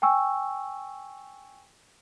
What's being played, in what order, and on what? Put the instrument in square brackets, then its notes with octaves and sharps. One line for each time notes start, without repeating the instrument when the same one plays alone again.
[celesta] G5 G#5 C#6 E6